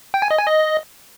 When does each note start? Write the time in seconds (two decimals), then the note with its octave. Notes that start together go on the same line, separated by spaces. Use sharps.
0.14 G5
0.22 G#5
0.31 D#5
0.39 G#5
0.47 D#5